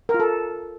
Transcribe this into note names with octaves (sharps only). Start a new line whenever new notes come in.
A#4
F4
A4